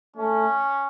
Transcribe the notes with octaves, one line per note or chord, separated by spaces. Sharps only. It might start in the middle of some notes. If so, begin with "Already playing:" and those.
A3 C#4